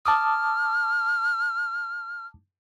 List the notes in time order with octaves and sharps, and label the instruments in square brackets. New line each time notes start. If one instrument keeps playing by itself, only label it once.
[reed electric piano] A5 D6 D#6 [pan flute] F6